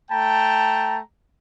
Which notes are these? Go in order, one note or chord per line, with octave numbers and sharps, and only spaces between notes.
A3 G5 A5 A#5